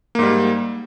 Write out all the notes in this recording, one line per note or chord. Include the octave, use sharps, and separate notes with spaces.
G#2 G3 A#3